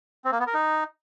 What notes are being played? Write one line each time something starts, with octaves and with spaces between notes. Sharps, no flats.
C4
A#3
B3
A#4
D#4